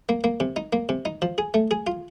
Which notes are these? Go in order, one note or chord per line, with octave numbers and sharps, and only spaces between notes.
A#3
A#3
C3
D#4
A#3
C3
D#4
F3
G#4
A3
G#4
F4